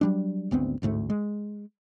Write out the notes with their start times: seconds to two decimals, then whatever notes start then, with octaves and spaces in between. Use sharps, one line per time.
0.01 F#3 G3 D4
0.51 G#1 D2 B3 C4
0.82 A1 D2 G#2 A3
1.10 G#3